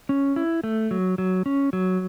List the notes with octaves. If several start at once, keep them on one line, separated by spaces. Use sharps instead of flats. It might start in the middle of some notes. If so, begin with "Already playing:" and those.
C#4
E4
A3
F#3
F#3
C#4
F#3